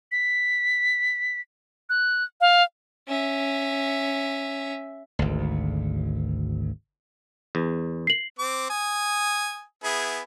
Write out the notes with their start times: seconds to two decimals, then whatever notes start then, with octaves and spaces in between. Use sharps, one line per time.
0.12 B6
1.89 F#6
2.41 F5
3.08 C#4 E5
5.19 G#1 D2
7.55 E2
8.07 C7 F#7
8.39 C4 D6
8.70 G#5 D#6
9.84 B3 E4 G#4